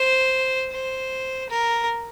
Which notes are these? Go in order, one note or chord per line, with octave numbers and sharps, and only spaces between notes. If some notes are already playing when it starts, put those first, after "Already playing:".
Already playing: C5
C5
A#4